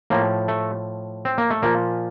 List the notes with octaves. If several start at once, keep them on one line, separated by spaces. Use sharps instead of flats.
A2 F3 A#3
A3
C4
A#3
A3
A#2 F3 A#3